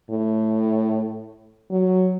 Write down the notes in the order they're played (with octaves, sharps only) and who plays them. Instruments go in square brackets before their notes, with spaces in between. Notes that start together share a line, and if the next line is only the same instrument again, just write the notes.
[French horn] A2
F#3